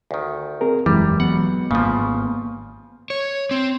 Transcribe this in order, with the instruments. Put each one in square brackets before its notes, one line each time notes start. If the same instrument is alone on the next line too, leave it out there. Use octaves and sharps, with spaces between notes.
[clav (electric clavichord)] D2 D#3
[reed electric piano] C4 G#4 A#4
[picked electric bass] E1 F#2 [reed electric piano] E3 G#3 [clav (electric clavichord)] G3
[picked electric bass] F#3 B3 [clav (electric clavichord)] F#5
[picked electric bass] G#1 A#3 B3 [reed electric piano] G2 [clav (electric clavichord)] C#3 F3
[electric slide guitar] C#5
C4